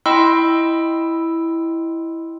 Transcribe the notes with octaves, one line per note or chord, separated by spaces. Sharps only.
E4 D#5 G5 B5 C6 E6